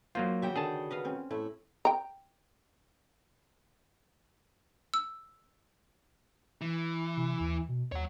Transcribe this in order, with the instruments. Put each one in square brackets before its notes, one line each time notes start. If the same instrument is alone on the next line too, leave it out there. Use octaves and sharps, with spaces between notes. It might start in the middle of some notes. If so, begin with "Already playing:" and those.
[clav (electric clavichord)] F#3 A#3 F4 [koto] D#4 C5
[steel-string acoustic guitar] C#3 F#4 G5 [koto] G4 E5
[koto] D3 D#3 A4 [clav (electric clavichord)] G#4 A5
[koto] B4 D#5 F5
C4 C#4
[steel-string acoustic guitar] A2 E4 [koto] A3
[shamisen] G5 A#5
[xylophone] E6
[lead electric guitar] E3
[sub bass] C3
D#2
B2
[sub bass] D#2 [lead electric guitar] C#5 F#5